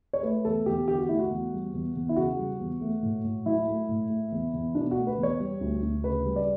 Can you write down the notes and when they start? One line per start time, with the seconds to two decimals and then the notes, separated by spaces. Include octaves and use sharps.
0.13 C#5
0.23 A3 B4
0.45 E2 A4
0.66 E2 G4
0.88 D3 G4
0.98 F#4
1.09 A3 E4
1.19 F#4
1.31 E2
1.53 G3
1.74 E2
1.95 E2
2.09 E4
2.16 C#3 F#4
2.38 G3
2.60 E2
2.81 A3
3.03 A2
3.24 A2
3.46 F#3 E4
3.67 A3
3.89 A2
4.10 A3
4.32 E2
4.53 E2
4.75 B2 D4
4.91 F#4
4.97 A3
5.07 B4
5.18 E2
5.23 C#5
5.40 G3
5.61 D2
5.83 D2
6.04 C#3 B4
6.25 G3
6.36 D5